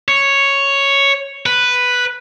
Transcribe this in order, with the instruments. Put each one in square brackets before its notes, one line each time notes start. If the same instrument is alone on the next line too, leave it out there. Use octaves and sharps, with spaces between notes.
[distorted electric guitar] C#5
B4